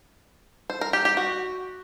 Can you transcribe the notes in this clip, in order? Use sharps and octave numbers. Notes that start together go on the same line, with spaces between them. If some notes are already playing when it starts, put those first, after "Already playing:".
C5
A#4
G4
G4
F#4